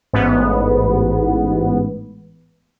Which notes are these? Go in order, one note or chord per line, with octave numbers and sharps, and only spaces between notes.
A1 G#2 B3